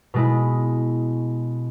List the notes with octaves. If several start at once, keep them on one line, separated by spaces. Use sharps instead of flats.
B2 G#3 E4